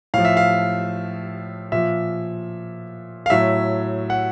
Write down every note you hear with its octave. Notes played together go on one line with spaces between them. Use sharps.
A2 F3 F5
E5
F5
A#2 F3 E5
F5
A2 F#3 E5
F#5